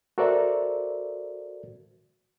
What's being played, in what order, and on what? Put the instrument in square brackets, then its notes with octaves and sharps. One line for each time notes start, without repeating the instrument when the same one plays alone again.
[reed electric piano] F#4 A4 A#4 C5 D5 E5